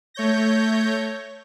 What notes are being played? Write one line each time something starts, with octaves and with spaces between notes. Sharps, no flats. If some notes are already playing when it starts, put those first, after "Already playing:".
A3 C#5 G6 A#6